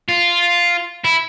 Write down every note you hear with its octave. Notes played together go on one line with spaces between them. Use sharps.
F4
E4